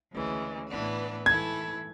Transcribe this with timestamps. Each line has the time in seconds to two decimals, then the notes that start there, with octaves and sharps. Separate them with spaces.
0.12 D2 C#3 E3 G#3
0.70 A2 E3 B3 D4
1.26 E3 A3 E4 A4 G#6